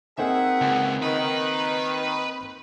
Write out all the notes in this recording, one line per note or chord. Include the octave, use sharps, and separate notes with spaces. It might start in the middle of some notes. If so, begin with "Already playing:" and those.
A#3 C4 D#4 G#4 E5 F#5
C#2
D#3 B4